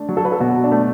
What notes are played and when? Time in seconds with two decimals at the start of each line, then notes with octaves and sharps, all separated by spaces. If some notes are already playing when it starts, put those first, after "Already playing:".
Already playing: A3 D4
0.09 F#3
0.17 A4
0.25 B4
0.32 A4
0.40 B2 F#4
0.64 D4
0.72 A3